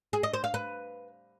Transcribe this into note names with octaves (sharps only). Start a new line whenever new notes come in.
G#4
D#5
C5
F5
B4